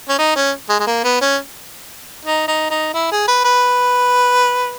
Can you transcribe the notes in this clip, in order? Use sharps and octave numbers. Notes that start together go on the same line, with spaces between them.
C#4
D#4
C#4
G#3
G#3
A#3
B3
C#4
D#4
D#4
D#4
E4
G#4
B4
B4